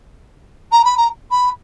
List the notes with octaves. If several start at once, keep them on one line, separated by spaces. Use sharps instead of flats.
A#5
B5
A#5
B5